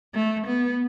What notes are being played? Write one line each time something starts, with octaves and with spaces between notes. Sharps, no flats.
A3
B3